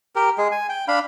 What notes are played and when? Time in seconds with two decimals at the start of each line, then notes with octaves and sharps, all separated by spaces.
0.16 G4 A#4
0.38 G#3 G#4
0.52 G#5
0.69 G5
0.88 D4 F5 B5